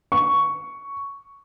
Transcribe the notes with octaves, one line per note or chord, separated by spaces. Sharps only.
C#6